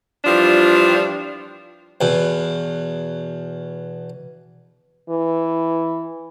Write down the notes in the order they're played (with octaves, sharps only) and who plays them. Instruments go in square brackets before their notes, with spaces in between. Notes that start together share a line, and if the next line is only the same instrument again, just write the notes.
[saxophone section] E3 F3 G3 D4 F4
[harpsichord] E2 B2
[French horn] E3